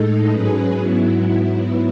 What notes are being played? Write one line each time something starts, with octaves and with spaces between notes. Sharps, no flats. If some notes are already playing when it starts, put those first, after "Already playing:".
Already playing: A2 G#3 D#4 A4
G#2 F#3 C#4 G#4 B4
G#2 F#3 B3 E4